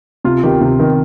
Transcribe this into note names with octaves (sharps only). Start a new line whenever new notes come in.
C3 F4
D#3 G4
C3
D#3